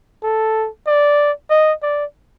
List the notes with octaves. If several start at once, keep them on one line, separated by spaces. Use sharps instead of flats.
A4
D5
D#5
D5